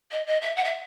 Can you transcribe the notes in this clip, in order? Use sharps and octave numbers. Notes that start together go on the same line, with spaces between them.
D#5
D#5
E5
F#5
E5